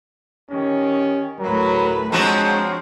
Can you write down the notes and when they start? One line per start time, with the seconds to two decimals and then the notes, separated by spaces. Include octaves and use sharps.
0.51 D#3 C#4 G4
1.40 D2 A2 F#3 A#4 B4
2.12 F3 G#3 C4 D4 F#4 C#5 F#5 A#5